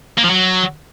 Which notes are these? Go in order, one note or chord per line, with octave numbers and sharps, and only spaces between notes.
A#3
F3
F#3